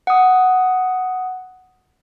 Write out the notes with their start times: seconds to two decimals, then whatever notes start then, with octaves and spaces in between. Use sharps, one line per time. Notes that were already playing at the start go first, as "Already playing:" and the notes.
0.07 F#5 D#6